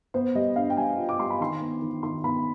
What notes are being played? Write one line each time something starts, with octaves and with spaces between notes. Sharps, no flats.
B3 C5
G3 D#5
D4 F5
G5
G3 G#5
F4
D6
G3 C6
B5
D#3 C6
B3
D#3
D#3 C6
B3 B5